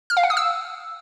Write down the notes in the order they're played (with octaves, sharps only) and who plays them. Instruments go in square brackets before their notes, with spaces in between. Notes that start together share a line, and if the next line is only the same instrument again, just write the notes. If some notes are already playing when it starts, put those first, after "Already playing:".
[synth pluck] F6
F5
F#5
D#6
E6